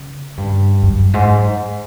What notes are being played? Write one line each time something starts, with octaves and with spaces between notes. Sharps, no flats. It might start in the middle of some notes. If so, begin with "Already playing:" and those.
Already playing: C#3
G2
F#2
G#2